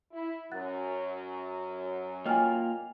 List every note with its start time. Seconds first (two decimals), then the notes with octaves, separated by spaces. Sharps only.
0.12 E4
0.52 F#2 F#5 F#6 A6
2.26 A#3 F4 C#5 D#5 G5 G#5 F6